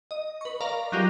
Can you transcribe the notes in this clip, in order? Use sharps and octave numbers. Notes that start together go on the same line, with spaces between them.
D#5
B4 C#6
A#4 D5 F5 A#5
F#3 G3 D#4 F4 G4 G#4